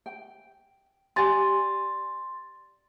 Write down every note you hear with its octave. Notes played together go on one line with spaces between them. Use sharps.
G5
G4 D5 G#5 C6 A6